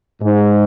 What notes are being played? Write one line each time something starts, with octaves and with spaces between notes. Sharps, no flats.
G#2